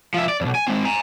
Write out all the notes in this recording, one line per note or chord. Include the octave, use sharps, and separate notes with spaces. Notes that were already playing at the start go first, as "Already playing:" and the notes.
F3 E5
D5
B1 F2
G#5
G#3 C4
G#5 A#5